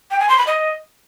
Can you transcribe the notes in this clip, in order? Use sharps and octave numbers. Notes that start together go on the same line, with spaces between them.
G5
G#5
C6
B5
D#5